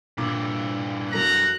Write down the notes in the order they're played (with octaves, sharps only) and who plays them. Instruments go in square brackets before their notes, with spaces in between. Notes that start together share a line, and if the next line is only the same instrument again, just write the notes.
[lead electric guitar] G2 E3 [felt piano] A#2 D3 D6
[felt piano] F#3 A4 A#4 [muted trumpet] A#5 [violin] F#6